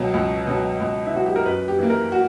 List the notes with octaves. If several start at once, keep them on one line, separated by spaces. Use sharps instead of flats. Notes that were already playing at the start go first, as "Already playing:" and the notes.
Already playing: C#2 B2 F#3
C#2
B2 F#3
C#2
E4
B2 F#3 F#4
G4
A#4
F#2 B4
G4
E3 A#3
A#4
F#4